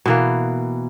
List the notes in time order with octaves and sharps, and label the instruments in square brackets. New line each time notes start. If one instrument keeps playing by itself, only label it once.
[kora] B2 E3 A#3